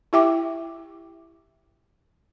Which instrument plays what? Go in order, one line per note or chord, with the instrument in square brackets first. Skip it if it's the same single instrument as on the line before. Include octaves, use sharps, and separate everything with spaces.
[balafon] E4 G4 E5 G5 D6